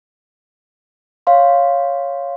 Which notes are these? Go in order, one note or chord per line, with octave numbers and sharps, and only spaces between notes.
C#5 F5 C6